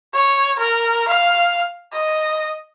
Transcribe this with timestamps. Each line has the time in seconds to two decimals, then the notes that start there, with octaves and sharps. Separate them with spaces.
0.14 C#5
0.59 A#4
1.08 F5
1.93 D#5